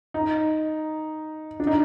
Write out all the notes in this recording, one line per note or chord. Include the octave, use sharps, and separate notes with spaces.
D#4
D4
D#4